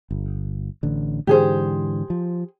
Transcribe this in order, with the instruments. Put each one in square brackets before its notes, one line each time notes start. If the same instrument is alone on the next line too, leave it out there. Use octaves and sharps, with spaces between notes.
[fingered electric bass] G1
A1 D3
[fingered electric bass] G#2 D3 E3 [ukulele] G4 G#4 C5
[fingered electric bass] F3